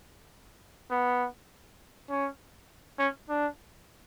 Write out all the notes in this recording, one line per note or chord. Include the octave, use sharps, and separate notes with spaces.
B3
C#4
C#4
D4